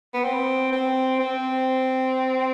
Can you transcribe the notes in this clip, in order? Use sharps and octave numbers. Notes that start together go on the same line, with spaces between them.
B3
C4
C4
C4